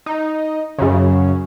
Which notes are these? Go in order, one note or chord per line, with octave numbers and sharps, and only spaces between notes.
D#4
F#2 C#3